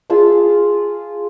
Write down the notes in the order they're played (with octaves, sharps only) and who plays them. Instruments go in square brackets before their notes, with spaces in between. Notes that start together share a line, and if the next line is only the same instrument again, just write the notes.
[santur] F4 G#4 A5 E6